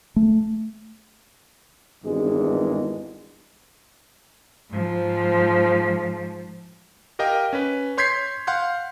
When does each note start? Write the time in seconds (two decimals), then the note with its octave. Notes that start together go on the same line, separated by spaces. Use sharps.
0.16 A3
2.05 G#1 E2 G2 G#3
4.71 G#2 F3
7.19 G4 A#4 D#5 F5 G5
7.53 C#4 B4
7.97 C#5 C6 G6 G#6 B6 C7
8.47 F5 F#5 C6 G6